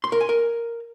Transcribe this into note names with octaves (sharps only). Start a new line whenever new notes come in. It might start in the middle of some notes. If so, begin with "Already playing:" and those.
C6
A#4
G#5
A#4